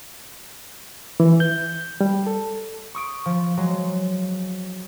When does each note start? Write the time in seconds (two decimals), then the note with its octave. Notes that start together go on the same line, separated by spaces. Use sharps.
1.20 E3
1.40 G6
2.01 G3
2.27 A4
2.95 C#6 D#6 D7
3.26 F3
3.57 F#3 G#3